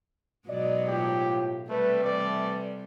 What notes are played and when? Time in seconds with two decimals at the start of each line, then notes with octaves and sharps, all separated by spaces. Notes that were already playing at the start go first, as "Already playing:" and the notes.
0.48 G#2 B2 F#3 D5 D#5
0.88 A2 F4 G4
1.69 C3 G3 A3 B4
2.04 E3 A3 B4 D5